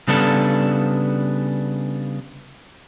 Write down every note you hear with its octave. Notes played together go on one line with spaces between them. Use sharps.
C#3 G3 B3 D4 A4